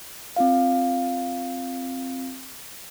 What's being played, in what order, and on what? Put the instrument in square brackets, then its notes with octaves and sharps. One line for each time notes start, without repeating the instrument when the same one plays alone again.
[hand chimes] C4 F4 F5